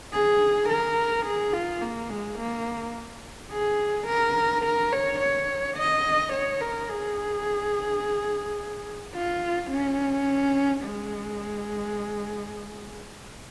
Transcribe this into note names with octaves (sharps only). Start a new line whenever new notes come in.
G#4
A#4
G#4
F4
A#3
G#3
A#3
G#4
A#4
A#4
C#5
C#5
D#5
C#5
A#4
G#4
F4
C#4
G#3